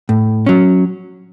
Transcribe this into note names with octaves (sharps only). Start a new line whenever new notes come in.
A2
F#3 C#4